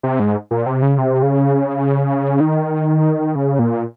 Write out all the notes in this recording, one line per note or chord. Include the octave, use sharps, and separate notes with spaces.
C3
G#2
A#2
C3
C#3
C3
C#3
D#3
C#3
A#2